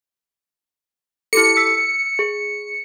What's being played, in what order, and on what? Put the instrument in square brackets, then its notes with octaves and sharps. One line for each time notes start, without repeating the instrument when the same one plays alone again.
[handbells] E4 G4 A4 [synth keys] C#7
[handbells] E6 B6
G#4